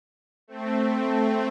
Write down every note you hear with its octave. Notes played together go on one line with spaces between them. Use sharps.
A3 C4